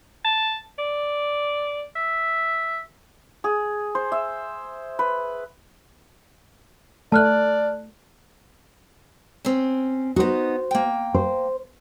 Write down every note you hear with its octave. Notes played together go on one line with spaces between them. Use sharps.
A5
D5
E5
G#4
C5
E5
B4
A3 D5 A5 F6 F#6
C4 C#4
B3 D#4 F#4 C5
A#3 G5
C5